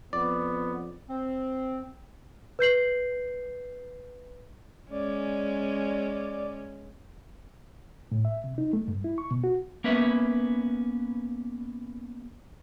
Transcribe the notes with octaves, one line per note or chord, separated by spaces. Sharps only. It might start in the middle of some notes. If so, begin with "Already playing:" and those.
F2 B3 D5
C4
B4 G6 C7 F#7
G#3 C#4 D5
A2
E5
C3
D#4
A3
G2
E4
C#6
B2
F#4
A#3 B3 C#4 B4 E5